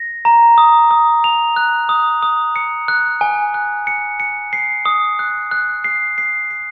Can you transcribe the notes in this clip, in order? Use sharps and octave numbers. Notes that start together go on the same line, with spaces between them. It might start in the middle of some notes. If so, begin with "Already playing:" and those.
Already playing: A#6
A#5
D#6
D#6
F7
F#6
D#6
D#6
C#7
F#6
G#5
F#6
C#7
C#7
C7
D#6
F#6
F#6
C7
C7
C7